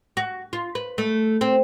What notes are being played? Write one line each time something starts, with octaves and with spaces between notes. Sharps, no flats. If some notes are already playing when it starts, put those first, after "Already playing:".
F#4
F4
B4
A3
C4